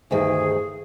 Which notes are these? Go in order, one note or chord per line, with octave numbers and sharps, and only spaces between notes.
D2 G2 D#3 G#4